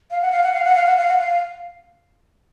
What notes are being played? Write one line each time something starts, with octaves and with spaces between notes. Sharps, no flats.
F5
F#5
F5
F#5
F5
F#5
F5
F#5
F5
F#5
F5